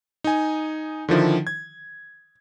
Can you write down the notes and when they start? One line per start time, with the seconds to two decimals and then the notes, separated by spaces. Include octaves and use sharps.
0.24 D#4 G#5
1.09 D3 D#3 F3 E4
1.47 G#6